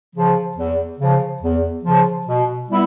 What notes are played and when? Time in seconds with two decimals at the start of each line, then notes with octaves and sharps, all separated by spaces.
0.15 C#3 F3
0.57 E2
0.99 C#3 F3
1.42 E2
1.83 C#3 F3
2.26 B2
2.69 G3 B3 E4